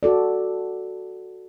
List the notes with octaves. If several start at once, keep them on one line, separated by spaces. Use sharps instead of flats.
F#4 A4 D5